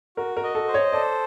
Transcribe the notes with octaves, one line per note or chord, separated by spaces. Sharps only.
F#4 A#4
A#4
D#5
A4
C5
C#5
A4 D5